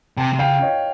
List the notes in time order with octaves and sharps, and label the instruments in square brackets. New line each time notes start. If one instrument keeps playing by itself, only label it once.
[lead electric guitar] C3 [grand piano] G5 A5
[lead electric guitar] C3
[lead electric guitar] C#3 [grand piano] F5 G5
[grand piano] C#5 D#5